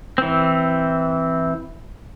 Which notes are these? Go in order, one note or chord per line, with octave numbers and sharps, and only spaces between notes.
E3 C4